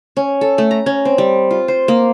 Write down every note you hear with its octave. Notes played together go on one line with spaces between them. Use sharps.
C#4
A4
A3
A#5
C#4
C4
G3
F4
C5
A#3